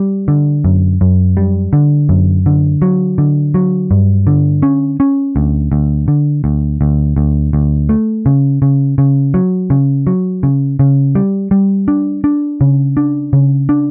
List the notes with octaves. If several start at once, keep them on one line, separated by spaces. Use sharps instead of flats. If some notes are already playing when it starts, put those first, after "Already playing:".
Already playing: G3
D3
F#2
F#2
G3
D3
F#2
D3
F#3
D3
F#3
G2
D3
C#4
C#4
D2
D2
D3
D2
D2
D2
D2
A3
C#3
C#3
C#3
F#3
C#3
F#3
C#3
C#3
G3
G3
D4
D4
C#3
D4
C#3
D4